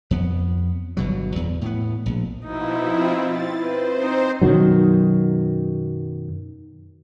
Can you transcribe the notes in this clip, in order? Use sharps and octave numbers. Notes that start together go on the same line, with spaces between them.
F2 B3
G1 B2 F#3
E2
A2 B3
A#1
B2 F3 D#4 E4
C4 E4 F4
A6
C4 B4 C5
C4 D#4
F#2 B2 D#3 F#3